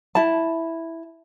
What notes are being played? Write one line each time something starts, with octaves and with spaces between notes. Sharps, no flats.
E4 A5